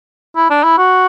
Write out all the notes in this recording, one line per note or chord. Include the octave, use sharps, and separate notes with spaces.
E4
D4
E4
F#4